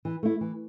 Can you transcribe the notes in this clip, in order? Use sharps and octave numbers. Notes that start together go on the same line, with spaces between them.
E3
A3 E4
E3